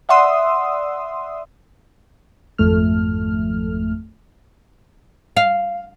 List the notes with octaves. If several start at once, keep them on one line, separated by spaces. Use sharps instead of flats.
D5 E5 F#5 C6 D#6 E6
G#1 F2 A3 F6
F5